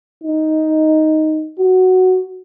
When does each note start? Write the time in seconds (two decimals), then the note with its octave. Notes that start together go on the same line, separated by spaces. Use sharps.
0.24 D#4
1.59 F#4